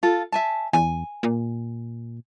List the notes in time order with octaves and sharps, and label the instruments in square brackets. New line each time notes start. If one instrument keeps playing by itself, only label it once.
[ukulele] F4 A4
E5 G#5 A5
[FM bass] E2 [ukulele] G#5
[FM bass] A#2